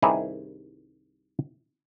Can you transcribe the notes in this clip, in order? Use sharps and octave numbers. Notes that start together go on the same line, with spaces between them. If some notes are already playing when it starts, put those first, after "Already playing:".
C2 G2 D#3 E4 G#4 D5